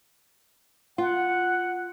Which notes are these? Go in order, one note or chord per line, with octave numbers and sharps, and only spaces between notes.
F4 F#5